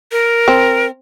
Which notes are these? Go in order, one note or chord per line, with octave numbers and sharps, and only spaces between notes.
A#4
C4